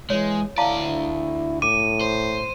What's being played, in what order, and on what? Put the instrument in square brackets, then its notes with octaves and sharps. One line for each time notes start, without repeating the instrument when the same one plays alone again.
[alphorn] E3 [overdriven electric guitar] G#3 [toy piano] C#5
[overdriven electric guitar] D2 D5 [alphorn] E4 [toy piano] F5 A5 A#5
[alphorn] A2 [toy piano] D6 [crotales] D#7
[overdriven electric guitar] C5